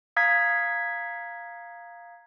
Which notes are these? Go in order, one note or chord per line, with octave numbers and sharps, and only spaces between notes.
F5 A#5 D#6 G#6 B6